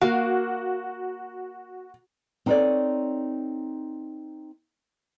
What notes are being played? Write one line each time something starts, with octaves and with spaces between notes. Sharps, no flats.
A#3 F#4 F5
C4 D#4 A4 B4 C#5 D5